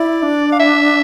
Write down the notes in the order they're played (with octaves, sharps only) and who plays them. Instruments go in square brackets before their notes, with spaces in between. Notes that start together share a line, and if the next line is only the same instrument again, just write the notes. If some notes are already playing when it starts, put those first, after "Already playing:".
Already playing: [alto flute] E4 [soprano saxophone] D5
[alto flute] D4
[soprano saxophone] F5
E5